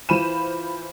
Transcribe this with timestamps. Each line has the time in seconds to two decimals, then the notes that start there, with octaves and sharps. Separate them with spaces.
0.09 E3 F4 C5 B5 D#7 E7